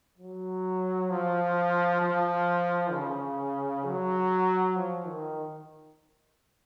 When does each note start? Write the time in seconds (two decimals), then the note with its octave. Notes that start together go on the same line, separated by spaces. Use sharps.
0.18 F#3
1.10 F3
2.01 F3
2.93 C#3
3.85 F#3
4.76 F3
5.06 D#3